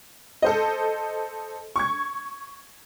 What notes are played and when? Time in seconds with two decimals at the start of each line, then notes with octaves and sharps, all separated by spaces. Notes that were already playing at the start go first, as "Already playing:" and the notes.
0.42 A4 C5 D#5
1.76 C#6 G#6